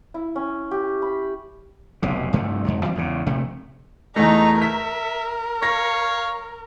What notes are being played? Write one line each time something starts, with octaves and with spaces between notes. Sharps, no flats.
E4
C#4
G4
B5
F1 B1 C3
C2 G2 F3 A3
F2 G#2 C3
E3 G3 C4
E2 G#2 C#3
A#1 C3 A3
E2 A3 D#4 A4 A#5
A#4 E5 B6
C#5 F5 C#6 A#6